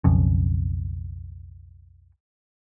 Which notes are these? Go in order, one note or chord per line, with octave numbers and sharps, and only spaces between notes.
B1 F2 C#3